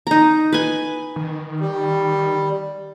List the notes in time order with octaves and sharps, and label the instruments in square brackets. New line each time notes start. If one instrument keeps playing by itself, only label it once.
[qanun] D#4 A#5
B4 G#5
[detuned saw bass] D#3
[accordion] G3